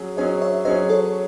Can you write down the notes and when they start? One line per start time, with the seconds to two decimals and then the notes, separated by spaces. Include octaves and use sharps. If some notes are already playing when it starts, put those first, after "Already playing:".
Already playing: F#3 C#4 G#4
0.17 F#3 C#4 G#4 C5 D#5
0.42 C#5 E5
0.65 F#3 C#4 G#4 C5 D#5
0.89 A4 C#5